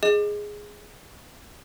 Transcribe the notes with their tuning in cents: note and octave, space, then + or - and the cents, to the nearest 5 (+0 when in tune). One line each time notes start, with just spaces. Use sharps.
G#4 +0 D#5 +0